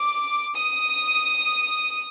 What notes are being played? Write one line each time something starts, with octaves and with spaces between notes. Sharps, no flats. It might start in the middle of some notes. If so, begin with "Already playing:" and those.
Already playing: D6
D#6